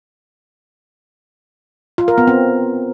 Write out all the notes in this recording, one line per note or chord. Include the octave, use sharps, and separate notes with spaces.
F4
A#4
B3
C4